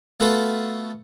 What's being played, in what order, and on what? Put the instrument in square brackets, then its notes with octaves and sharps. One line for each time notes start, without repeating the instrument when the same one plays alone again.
[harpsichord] A3 B3 F4 F#4 A4 B4